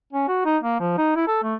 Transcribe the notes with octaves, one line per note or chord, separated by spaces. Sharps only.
C#4
F#4
D#4
A#3
F3
D#4
E4
A4
A3